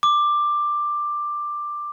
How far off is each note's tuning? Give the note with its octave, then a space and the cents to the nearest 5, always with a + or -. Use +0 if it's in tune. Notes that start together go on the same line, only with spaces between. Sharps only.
D6 +10